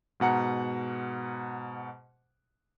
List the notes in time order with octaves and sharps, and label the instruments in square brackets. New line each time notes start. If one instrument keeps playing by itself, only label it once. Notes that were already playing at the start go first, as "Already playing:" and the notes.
[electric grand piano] G#2 B2 F#5 A#5 C#7